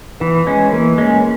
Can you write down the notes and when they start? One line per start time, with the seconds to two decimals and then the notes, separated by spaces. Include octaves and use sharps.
0.20 E3 B3
0.47 G#3 C#4
0.72 E3 A#3
0.98 G#3 C#4